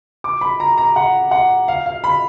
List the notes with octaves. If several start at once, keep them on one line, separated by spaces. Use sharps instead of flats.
D6
B5
A#5
A#5
F#5
F#5
F5
F5
B5